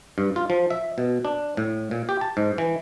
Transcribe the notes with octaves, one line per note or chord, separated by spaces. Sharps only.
G2
F4
F3
E5
B2
D4
A2
A#2
G4
A5
G#2
E3